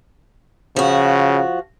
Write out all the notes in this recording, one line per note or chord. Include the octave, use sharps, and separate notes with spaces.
C#3 F3 F#4